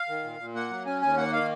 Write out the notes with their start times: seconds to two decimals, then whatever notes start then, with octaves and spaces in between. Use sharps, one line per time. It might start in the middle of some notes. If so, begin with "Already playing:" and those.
Already playing: F5
0.09 D#3
0.24 A#2
0.39 A#2
0.55 A#3 F#5
0.71 F#3
0.86 C#4 G#5
1.02 D#2 G#5
1.17 A#3 F#5
1.32 D#3 F5